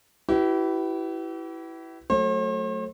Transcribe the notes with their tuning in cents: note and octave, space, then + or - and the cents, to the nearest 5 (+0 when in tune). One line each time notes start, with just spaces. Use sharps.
E4 +0 G4 -45 B4 +0
F#3 +0 A3 +0 C5 +45